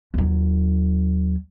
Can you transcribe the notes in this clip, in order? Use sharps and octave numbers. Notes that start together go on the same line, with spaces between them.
D#2 F#3